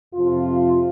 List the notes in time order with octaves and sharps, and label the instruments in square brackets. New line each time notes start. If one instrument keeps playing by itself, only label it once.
[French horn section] F2 C3 F3 F4